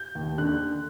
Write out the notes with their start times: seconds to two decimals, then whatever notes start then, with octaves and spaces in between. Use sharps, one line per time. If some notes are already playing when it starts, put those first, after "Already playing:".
Already playing: G6
0.15 D#2
0.37 D3 F#6